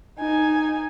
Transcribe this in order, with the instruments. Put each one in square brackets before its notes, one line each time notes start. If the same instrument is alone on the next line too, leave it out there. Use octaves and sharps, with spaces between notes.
[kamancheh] D#4 G#5